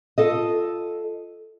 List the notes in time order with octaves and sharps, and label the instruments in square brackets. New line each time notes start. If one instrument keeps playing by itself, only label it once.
[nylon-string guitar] F4 A4 D#5